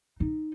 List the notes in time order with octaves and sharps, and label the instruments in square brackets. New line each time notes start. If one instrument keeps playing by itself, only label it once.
[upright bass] D#4